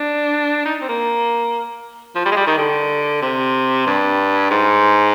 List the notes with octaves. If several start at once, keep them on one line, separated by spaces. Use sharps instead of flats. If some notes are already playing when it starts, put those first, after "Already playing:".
Already playing: D4
D#4
C4
A#3
F3
G3
G#3
G3
D#3
D3
C3
G2
G#2